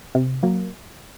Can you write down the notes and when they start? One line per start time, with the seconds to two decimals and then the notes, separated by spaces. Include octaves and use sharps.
0.15 C3
0.43 F#3 A#3